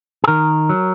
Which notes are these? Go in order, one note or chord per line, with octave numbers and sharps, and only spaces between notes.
G#4
D#3 A#4
F#3